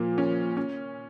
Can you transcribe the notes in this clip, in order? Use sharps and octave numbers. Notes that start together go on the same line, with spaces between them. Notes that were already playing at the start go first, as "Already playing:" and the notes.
Already playing: A#2 F3 A#3
C#4
C#4